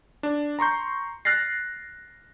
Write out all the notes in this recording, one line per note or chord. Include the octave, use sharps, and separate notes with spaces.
D4
A#5 C6 C#6 G6
F6 F#6 A6 A#6 C7